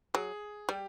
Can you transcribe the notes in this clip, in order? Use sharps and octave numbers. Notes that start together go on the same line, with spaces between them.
F#3 G#4
G3 G4